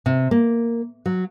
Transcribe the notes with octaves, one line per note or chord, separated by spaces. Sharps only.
C3
A#3
F#3